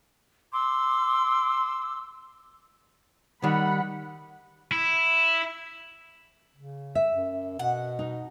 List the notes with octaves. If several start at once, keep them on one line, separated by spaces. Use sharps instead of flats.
C6 D6 E6
D#3 G3 F#5 B5
E4
C#3
E5
F#2
B2 F#5
D#4